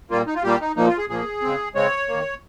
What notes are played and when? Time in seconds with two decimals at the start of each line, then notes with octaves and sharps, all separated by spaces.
0.10 A#2 G3 A#3 F4
0.27 D#4
0.35 F4
0.44 A#2 G3 A#3 G4
0.60 D#4
0.76 A#2 F3 A#3 D#4
0.88 F4
0.98 G#4
1.09 A#2 F3 A#3 G#4
1.42 C#3 G#3 C4
1.75 C#3 G#3 C4 C#5
2.08 D#3 A#3